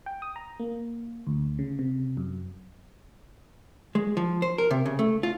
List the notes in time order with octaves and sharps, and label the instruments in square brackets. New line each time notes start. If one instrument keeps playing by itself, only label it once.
[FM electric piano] G5
D#6
A#5
A#3
D2
C#3
C3
F#2
[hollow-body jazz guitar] G#3
F3
C5
A#4
C3
C#3
A3
F4